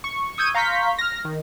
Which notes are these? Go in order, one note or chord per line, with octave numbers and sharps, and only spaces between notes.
C#6
C#6 D#6 E6 G6 G#6 D#7
F5 A#5 C6 C#6 G6 B6
F6 A#6
D#3